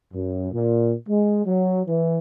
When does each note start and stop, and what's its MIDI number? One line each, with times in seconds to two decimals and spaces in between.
0.14 0.49 42
0.52 0.94 46
1.08 1.41 56
1.46 1.81 54
1.87 2.18 52